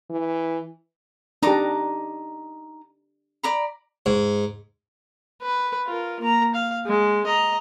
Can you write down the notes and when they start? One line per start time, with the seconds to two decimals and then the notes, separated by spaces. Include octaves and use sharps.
0.10 E3
1.43 D4 D#4 G4 A#5 D6
3.43 D5 A#5 B5
4.06 G#2
5.42 B4
5.86 F4 A#4
6.20 A#3 A#5
6.55 F5
6.86 G#3
7.26 D#5 A#5